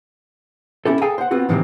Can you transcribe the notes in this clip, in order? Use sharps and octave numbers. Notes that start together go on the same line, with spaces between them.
C#4 E4 G4 A4
G#4 A4 F5 G5 G#5 A#5
C5 F#5
B3 C4 F4 F#4 B4
A2 C3 D#3 E3 F#3 A#3